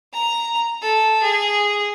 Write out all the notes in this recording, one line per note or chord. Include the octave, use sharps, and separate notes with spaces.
A#5
A4
G#4